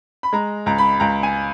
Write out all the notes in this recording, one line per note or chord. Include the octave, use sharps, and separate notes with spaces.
B5
G#3 A#5
C#2 A#5
B5
C#2 A#5
G#5